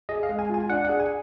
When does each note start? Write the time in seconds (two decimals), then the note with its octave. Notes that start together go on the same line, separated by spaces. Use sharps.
0.09 G#4 D#5
0.23 F5
0.29 G#3
0.39 G#5
0.50 F4 G#5
0.70 D4 F#5
0.85 F#5
0.89 G#4
1.00 G#5